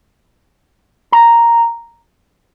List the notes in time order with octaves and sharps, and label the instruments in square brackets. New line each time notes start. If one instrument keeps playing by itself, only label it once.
[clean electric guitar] A#5